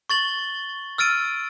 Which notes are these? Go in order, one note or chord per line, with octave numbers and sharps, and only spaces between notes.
C#6 A6 F#7 G7
E6 F6 A6 D7 D#7